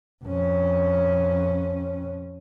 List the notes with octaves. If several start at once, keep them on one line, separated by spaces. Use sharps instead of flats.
F2 C#4